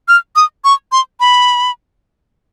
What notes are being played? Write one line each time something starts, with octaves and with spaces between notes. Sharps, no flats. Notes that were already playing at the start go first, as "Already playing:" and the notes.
F6
D#6
C#6
C6
B5